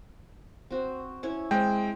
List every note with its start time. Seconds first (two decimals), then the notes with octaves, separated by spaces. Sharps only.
0.70 C4 F#4
1.23 C#4 E4 C#5
1.51 G#3 C4 G5